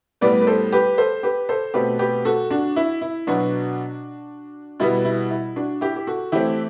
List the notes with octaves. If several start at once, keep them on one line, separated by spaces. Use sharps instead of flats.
A2 G3 B3 B4 D5
B4
A4 C5
G4 B4
A4 C5
G4 B4
A4 C5
B2 A3 C4 G4 B4
G4 B4
F#4 A4
D4 F#4
E4
E4
B2 F#3 B3 D4 F#4
B2 G3 B3 E4
E4
E4
D4 F#4
E4 G4
G4
F#4 A4
E3 A3 C4 E4 G4